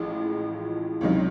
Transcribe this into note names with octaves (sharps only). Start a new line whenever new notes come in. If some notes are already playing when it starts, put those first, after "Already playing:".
Already playing: A1 A2 F3 G#3
C#2 C3 D#3 F#3